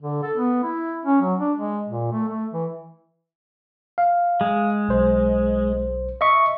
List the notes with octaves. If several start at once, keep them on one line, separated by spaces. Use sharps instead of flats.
D3
A4
B3
E4
C#4
F#3
D4
G#3
A#2
A3
A3
E3
F5
G#3
B1 C5
D#5 E5 C#6